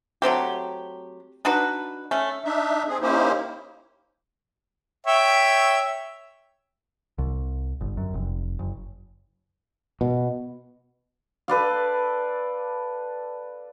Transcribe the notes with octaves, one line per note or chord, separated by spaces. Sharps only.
F#3 A3 C4 G4
D4 D#4 F#4 B4
A3 C#4
D4 D#4 E5
C4 G#4
A#3 C#4 D#4 E4 G4 C5
C#5 E5 G5
C2
G1
F#2
F1
F#1
B2
A4 B4 D5 F5